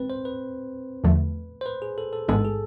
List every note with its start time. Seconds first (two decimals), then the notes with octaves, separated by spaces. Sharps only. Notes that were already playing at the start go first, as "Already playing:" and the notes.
Already playing: G#1 G#2 C4 B4
0.10 C5
0.25 B4
1.04 E2 D3 F3 A3
1.61 C5
1.66 B4
1.82 G#4
1.98 A4
2.13 A4
2.28 A1 G#2 G#3 B3 D4 A4
2.45 G#4